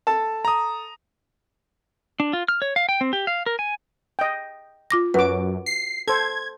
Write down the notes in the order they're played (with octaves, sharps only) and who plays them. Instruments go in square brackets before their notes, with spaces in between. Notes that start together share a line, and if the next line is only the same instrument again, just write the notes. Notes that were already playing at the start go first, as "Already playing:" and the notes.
[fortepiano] A4 A5
[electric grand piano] A#5 D#6
[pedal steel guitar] D4
F4
F6
C#5
F5
G5
C4
G4
F5
A#4
G#5
[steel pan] D#5 G5
[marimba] F4 D6 A#6
[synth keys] F#2 [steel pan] F#4 D6 [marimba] B4
[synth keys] C7
[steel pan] A4 C5 [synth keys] G#6